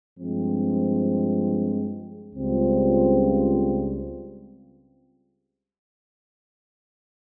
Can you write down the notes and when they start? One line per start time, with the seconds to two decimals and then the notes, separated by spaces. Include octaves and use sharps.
0.18 G2 F3 G#3 C4
2.35 C#2 C#3 G3 C4 F4